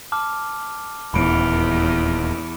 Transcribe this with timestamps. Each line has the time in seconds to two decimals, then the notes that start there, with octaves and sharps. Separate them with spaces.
0.12 A5 D6 F6
1.14 D#1 E2 B5 D7